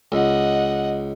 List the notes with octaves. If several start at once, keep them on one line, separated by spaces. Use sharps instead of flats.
C#2 D#5 F#5